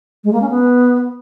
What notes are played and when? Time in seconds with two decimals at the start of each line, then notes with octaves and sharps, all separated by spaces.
0.24 G#3
0.33 A#3
0.41 C#4
0.50 B3